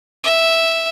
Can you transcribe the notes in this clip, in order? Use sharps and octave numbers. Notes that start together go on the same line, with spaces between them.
E5